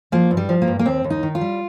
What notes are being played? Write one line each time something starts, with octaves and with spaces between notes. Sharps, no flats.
F3 A#3
G2
G3
F3
A#3
G2
A#3
D#2 C4
D#2
D#4
D#3
F4
G3